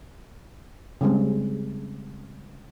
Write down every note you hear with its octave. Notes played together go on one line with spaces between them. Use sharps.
C#3 G3 G#3 C4